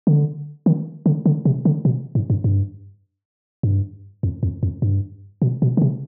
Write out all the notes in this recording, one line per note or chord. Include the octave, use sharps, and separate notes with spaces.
D3
D#3
D3
D3
C3
D3
B2
G#2
G2
G2
G2
F2
F2
F2
G2
B2
B2
D3
C3